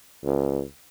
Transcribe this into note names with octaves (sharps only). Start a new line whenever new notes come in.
C#2